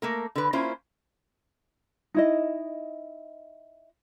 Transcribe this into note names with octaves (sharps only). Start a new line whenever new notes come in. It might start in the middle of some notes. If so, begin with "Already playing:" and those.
A3 A#3 A#4
D3 B4
A#3 C#4 E4 F4 C5
D#4 E4 D#5